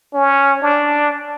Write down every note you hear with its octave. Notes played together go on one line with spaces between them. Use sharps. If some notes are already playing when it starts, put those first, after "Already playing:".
C#4
D4